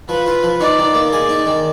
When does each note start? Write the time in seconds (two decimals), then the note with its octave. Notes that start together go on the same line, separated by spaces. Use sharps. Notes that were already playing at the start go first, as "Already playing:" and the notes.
0.09 F3 B4
0.26 F4
0.43 F3
0.60 D#4 D5
0.78 D#3
0.94 A#3
1.12 G#4 D5
1.29 D#4
1.46 D#3